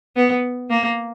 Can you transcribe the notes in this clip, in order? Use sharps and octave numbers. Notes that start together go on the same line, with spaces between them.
B3
A#3